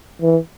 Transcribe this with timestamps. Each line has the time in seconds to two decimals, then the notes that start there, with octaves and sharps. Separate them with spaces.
0.22 E3